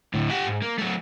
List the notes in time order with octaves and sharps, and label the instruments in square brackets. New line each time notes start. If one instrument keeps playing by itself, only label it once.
[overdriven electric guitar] D2 A2
G4 F#5
G#2
A#3
F#3 A3